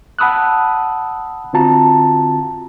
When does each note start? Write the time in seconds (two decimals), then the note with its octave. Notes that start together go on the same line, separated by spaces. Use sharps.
0.19 F#5 A5 B5 D#6 E6 F#6
1.53 D3 C4 F4 F#4 A5 A#5